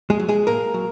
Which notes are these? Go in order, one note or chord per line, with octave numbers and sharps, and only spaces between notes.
G#3 G#4
F#3
G#3 G#4
A2 A#3 A#4
F#3